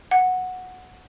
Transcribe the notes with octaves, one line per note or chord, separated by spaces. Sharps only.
F#5